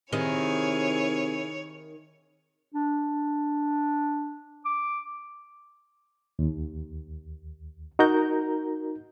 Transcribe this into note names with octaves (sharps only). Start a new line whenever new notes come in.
C3 D#3 E4 G#4 C#5
D4
D6
D#2
D#4 F#4 A#4 A#5 G6